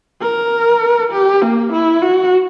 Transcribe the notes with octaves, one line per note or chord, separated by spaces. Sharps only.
A#4
G4
A#3
E4
F#4